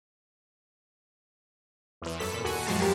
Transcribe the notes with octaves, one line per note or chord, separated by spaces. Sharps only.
E2 E3
F#2 A4 B6
A#2
D#2 F#4 G#5 F#6
F#2 A#2 F3 G#3 F5 A5
F#2 G3 G4 A#4